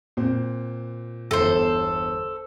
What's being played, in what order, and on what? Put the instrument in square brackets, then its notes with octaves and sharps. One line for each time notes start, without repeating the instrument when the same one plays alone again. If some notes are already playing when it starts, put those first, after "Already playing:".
[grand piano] A#2 C4
[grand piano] G1 E2 [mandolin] A4 C5